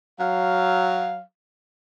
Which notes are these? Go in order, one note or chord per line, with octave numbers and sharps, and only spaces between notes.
F#3 F5